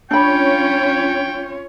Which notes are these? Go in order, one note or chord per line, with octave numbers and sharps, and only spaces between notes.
C#4 D4 F4 C#5 G5 B5